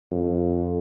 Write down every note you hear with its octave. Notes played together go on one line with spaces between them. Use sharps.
F2